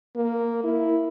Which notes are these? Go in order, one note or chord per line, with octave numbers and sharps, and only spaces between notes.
A#3
E4